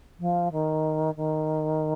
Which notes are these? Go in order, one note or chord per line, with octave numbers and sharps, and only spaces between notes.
F3
D#3
D#3